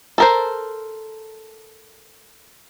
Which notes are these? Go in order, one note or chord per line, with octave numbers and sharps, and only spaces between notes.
A4 A#4 C5